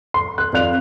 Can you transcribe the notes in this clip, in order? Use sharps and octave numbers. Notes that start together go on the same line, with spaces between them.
C6
F#6
F2 D5 F5 F#6 F7